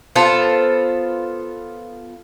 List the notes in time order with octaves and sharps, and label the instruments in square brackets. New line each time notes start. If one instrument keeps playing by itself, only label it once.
[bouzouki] B3 F4 A4 C5